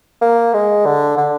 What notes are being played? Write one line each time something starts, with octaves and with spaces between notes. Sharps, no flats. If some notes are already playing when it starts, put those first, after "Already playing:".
A#3
G#3
D3
D3